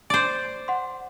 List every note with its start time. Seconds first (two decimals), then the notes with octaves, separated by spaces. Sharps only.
0.10 C5 D5 D7
0.68 F#5 C6